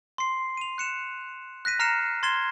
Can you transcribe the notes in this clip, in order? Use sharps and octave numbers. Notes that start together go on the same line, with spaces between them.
C6 C7
D#7 F7
F#6 C#7 E7
F#6 A#6 B6 D#7
A#5 F6 A#6 C7 C#7 E7
C6 G#6 A6 C7 E7 G7